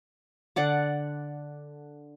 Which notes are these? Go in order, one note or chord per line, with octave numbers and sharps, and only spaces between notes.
D3 D5 F#5 D6